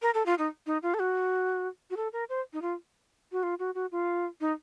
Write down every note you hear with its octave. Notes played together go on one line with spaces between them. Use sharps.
A#4
A4
F4
D#4
D#4
F4
A4
F#4
F#4
A4
A#4
C5
D#4
F4
F#4
F4
F#4
F#4
F4
D#4